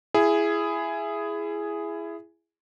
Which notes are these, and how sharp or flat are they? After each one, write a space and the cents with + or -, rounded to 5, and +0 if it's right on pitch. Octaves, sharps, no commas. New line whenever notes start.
E4 +20 G#4 +0